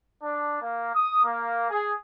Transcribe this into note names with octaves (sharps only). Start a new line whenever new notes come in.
D4
A#3
D#6
A#3
G#4